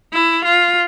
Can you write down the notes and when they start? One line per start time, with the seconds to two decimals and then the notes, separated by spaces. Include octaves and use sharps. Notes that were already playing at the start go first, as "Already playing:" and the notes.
0.13 E4
0.44 F4